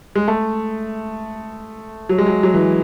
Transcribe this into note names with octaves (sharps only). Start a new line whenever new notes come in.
G#3
A3
F#3
G#3
F#3
F#3
E3